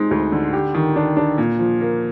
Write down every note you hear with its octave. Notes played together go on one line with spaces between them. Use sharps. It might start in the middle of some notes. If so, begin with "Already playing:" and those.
Already playing: G#3 C4 D#4
D2
D3
G4
D#3
D4
D4
A#2
F3
A#3